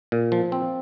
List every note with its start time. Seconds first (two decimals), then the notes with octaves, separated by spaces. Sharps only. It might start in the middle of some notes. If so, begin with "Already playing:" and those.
0.12 A#2
0.32 F3
0.52 C4